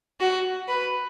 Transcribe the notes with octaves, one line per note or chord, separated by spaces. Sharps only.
F#4
B4